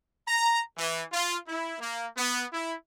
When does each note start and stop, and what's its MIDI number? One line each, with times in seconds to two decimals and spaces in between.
0.28 0.61 82
0.78 1.03 52
1.12 1.37 65
1.48 1.76 64
1.80 2.07 58
2.17 2.44 59
2.53 2.74 64